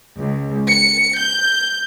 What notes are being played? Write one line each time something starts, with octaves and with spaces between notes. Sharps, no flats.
C#2
C#7
G6